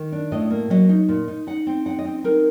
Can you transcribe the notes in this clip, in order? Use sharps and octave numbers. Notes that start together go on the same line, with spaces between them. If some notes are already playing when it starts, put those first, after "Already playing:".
Already playing: D#3
D4
A2 D#5
A#3
F#3 D#5
D#4
A#2
D#4
D#4 F#5
C4
D#4 F#5
D#5
C4
D#4 A#4